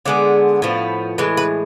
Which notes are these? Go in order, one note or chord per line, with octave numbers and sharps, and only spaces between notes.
D3 G#3 B3 D5
A2 F3 B3
A2 E3 G#3 B4
B4